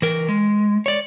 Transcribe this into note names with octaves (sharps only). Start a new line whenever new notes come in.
E3 A#4
G#3
C#5 D5